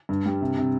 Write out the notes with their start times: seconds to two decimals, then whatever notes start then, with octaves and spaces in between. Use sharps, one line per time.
0.09 G2
0.26 G3
0.41 C3
0.57 C3